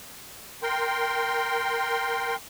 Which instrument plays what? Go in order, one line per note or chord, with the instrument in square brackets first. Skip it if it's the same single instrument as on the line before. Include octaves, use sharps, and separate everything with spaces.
[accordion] A#4 G5 C6